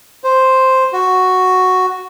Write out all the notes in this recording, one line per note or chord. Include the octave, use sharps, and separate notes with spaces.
C5
F#4